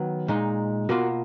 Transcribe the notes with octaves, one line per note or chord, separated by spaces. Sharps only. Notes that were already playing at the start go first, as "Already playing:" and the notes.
Already playing: D#3 F#3 B3
A#2 G#3 D#4
B2 A#3 F4 F#4 A#4